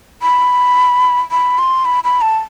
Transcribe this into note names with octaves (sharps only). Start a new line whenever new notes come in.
B5
B5
C6
B5
B5
A5